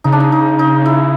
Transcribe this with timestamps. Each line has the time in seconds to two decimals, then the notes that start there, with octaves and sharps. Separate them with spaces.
0.04 C#3 D#4
0.12 D4
0.20 D#4
0.32 D#4
0.59 D#4
0.86 E4